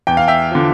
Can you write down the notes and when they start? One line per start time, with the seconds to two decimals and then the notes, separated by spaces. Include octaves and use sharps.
0.07 E2 G5
0.17 F5
0.28 E5 G5
0.51 D3 F3